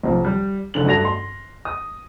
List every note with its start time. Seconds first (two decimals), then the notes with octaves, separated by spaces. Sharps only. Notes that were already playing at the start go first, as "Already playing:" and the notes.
0.03 B1 C3 F3
0.25 G3
0.74 F#1 D3 F#7
0.86 G2 A3 F#4 A#6 F7
1.05 C6
1.65 D#6